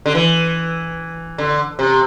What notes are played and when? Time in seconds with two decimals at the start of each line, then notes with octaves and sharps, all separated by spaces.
0.06 D3
0.15 E3
1.38 D3
1.79 C3